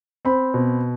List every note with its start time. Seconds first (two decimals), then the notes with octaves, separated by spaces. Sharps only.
0.25 C4 B5
0.54 B2